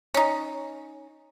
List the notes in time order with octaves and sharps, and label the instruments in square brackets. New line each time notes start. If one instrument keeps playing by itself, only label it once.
[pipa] C#4 D#4